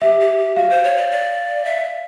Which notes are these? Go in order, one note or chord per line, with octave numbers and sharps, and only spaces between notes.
G4 E5
G4
G4
F#4 F5
C5
C#5
D5
D5
E5